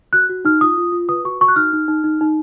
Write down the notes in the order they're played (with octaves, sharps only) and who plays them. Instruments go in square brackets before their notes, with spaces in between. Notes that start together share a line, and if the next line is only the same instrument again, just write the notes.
[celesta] F#4 F#6
F#4
D#4 F6
F4 D#6
F4
F4
B4 D#6
F#4 C#6
F#4 C#6
F#6
D#4 F6
D#4
D#4
D#4
D#4